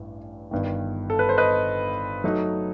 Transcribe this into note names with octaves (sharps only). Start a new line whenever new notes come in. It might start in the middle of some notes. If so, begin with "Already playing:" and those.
Already playing: A1 G2
G1 G2 D#3
A4
B4
C5
B4 D#5
F#3 A3 D#4